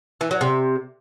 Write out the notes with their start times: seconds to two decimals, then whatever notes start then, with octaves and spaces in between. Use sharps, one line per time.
0.21 E3
0.31 F#3
0.41 C3